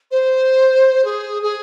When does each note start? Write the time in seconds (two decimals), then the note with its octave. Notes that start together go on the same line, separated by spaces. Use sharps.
0.11 C5
1.04 G#4
1.42 G#4